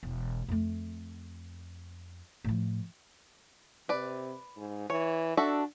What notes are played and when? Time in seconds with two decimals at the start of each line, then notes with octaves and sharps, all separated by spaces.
0.03 E1
0.48 F2 A3
2.44 A2 F3
3.89 C3 B4 D5
4.57 G#2
4.90 E3 C#5
5.37 D4 F#4 A4 E5